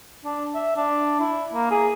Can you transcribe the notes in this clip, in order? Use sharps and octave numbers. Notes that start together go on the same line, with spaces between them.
D4
E5
D4
E4
A#3
G#4